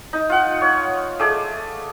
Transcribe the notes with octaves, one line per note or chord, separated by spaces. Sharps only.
D#4
F4 F#5
C#5
A3 G#4 D5